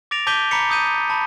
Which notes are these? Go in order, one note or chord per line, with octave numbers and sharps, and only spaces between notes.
D6 A6 A#6 D7 F7
A5 D6 G6 B6 D#7 G7
A#5 B5 D6 B6 C#7 F7
D6 D#6 G6 D#7
A5 B5